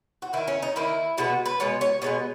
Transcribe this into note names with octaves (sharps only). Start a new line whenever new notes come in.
F#4
D#3 A#3 E4
C#4
D#4
D#3 A#3 E4
B2 G#3 B3 F#4
B4
B2 G#3 B3 C#5
C#5
B2 G#3 B3 C#5